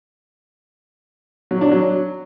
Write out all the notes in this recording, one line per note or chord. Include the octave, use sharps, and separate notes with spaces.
F#3
D4
F#3